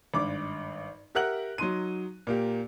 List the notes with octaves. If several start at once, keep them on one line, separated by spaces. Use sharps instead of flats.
G#1 G2 D6
G4 A#4 E5 F#5 F#6 F#7
F#3 D#4 C6 D#7
A#2 A#3 G4